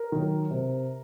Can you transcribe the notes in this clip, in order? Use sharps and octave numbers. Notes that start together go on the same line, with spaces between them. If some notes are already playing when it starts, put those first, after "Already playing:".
Already playing: A#4
D#3 F#3
C3